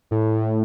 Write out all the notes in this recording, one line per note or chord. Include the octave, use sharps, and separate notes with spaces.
A2